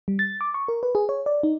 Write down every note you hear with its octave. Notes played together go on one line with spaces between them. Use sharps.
G3
A6
D6
C#6
A#4
B4
G#4
C#5
D5
D#4